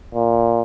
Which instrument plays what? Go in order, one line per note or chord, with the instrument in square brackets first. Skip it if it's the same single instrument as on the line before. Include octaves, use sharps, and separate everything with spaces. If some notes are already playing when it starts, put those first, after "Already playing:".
[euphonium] A#2